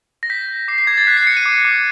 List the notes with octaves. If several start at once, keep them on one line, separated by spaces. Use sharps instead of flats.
A#6
G6 B6
G6
D6 C7
C7
D6 G#6
A6
F#6 B6
C7
F#6 C#7
D#7
D6
D6